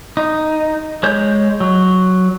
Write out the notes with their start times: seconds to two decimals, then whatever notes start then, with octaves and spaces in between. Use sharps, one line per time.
0.17 D#4
1.03 G#3 C#5 G6
1.60 F#3